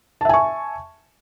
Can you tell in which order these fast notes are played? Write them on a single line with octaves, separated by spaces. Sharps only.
A5 E5 G#5 C#6